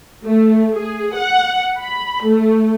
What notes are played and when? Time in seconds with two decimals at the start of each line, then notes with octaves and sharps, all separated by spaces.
0.24 A3
0.73 G#4
1.16 F#5
1.80 B5
2.26 A3